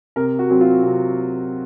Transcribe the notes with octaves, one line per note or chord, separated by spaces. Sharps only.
C3 A#4
F#4
F#3 C4
F4
C3